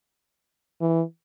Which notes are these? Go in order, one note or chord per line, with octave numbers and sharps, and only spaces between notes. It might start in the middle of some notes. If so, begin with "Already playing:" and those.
E3